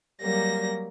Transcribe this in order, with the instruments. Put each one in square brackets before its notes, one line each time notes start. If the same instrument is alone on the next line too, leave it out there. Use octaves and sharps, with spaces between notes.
[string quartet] F#3 G3 A#3 A#6